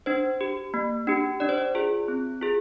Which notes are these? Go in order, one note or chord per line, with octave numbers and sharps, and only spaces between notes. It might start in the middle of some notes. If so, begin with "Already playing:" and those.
D4 C5
G4
A#3
D4 G4
D4 D5
C5
D5
F4 G#4
C4
F4 G#4